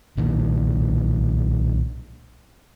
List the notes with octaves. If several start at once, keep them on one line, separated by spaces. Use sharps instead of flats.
B1 A#2 D#3